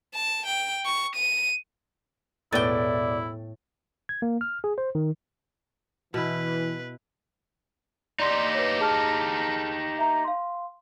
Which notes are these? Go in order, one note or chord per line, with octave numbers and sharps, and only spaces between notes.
A5
G5
C#6
D#7
E1 A2 B3 E4 D5 G5 A6
G#6
A#3
F6
G#4
C5
D#3
B2 E3 E4 B4
D#4 G4 D5 C6
B4 C#5
G#4 A5 F6
E5 A#5
F5 C6